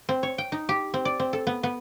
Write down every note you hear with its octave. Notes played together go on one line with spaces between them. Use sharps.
C4
C#5
G5
D#4
G4
C4
D5
C4
A4
B3
B3